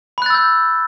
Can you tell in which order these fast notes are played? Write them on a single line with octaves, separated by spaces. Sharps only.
B5 F#6 A6 E6 G6